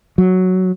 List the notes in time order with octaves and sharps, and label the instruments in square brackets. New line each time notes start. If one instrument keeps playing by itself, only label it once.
[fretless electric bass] F#3